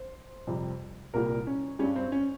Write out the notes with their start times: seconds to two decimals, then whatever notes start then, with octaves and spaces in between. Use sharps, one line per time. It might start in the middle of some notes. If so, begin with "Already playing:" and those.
Already playing: C5
0.47 F2 C3 G3
1.14 C2 A#2 G3 A#4
1.47 C#4
1.79 G2 G3 C#4
1.96 C4
2.12 C#4